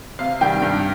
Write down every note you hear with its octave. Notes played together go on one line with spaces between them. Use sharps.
C3 F5
D#3 G3 G5
G2